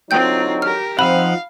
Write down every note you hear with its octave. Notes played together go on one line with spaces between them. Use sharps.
D3 F#3 C4 D#4 F4 G5 G6
G4 A#4 F6
F3 C4 D#4 F5 F#5 B5